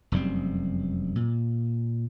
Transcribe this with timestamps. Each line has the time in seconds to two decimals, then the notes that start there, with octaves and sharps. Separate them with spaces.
0.12 F1 F#2 G3 C4
1.16 A#2